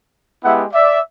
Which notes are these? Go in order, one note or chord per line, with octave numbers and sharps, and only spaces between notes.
G#3 B3 E4 G4 E5 F#5
D5 E5